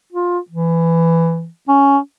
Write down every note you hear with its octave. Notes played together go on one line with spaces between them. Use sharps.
F4
E3
C#4